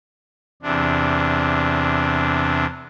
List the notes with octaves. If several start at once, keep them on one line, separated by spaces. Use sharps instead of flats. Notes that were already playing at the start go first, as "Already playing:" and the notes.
E2 C3 D4